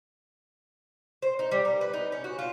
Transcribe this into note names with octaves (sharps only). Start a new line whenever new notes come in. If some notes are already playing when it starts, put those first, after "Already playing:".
C5
D#4
G3
A#4
B4
D#4
C#4
F#4
F4